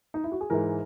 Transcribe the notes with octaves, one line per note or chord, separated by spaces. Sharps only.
D#4
E4
F#4
G#4
G#2 E3 A#4